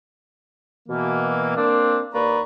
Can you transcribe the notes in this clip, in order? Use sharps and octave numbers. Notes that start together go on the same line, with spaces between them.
B2 E3 A#3
A#3 C4 D4
D#2 A#3 B4 D5 A#5 C#6